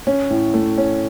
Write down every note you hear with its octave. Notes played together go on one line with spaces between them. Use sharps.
C#4
A2
A3
C#4